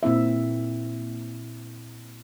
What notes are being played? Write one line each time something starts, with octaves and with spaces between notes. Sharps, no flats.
A#2 C4 E4 E5